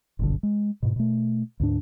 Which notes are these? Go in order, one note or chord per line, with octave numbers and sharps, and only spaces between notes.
F#1 B1 G2 D3
G#3
G#2 B2
B2 A3
D2 G#2 D4